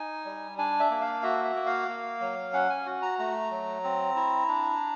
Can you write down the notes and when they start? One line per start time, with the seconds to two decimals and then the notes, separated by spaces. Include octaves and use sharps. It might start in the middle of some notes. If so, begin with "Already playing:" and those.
Already playing: D#4 G#5
0.25 G3
0.58 D4 G#5
0.80 E5
0.91 A#3
1.01 F5
1.23 F#4 E5
1.44 E5
1.55 A#3
1.66 F5
1.88 A#3
2.21 F#3
2.53 C#4 F#5
2.70 G#5
2.86 F#4
3.02 A#5
3.19 A3 A#5
3.51 F#3
3.84 C4
4.16 E4
4.48 D4